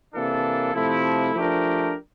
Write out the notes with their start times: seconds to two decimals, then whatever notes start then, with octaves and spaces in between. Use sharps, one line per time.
0.13 C3 E3 A#3 D4 A4
0.74 C3 F3 A3 E4
1.35 F3 A3 D4 G4 A#4